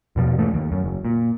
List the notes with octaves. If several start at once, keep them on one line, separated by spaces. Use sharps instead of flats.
E2 B2 F3
G2 E3 F3 A3
D#2
F#2
F#1
A#2